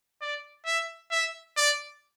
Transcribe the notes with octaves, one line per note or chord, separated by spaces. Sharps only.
D5
E5
E5
D5